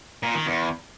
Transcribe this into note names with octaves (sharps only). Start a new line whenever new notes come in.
A#2
D#3
E2